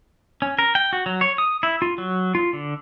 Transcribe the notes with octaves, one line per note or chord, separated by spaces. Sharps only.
C#4
A#4
G5
F#4
F#3
C#5
D#6
E4
F4
F#3
F4
D3